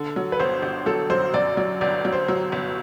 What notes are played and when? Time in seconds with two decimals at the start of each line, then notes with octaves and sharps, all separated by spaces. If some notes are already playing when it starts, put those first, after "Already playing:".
Already playing: D3 A4
0.16 F#3
0.32 B4
0.40 G1 C5
0.62 G1
0.86 F#3 A4
1.10 F#2 C5
1.34 F#2 D5
1.57 F#3 D5
1.81 G1 D5
2.05 F#3
2.12 C5
2.28 F#3
2.52 G1